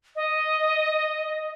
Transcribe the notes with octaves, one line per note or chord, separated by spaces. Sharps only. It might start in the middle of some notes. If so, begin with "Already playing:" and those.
D#5